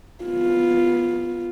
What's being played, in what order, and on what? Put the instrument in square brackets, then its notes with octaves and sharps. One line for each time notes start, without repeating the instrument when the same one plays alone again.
[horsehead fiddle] B3 F4